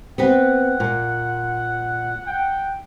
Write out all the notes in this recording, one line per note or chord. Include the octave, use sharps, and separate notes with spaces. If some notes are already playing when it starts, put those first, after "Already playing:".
B3 C4 B4 F#5
A#2
F#5 G5